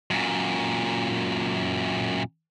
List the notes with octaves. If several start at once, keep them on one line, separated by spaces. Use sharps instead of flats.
F#2 A#2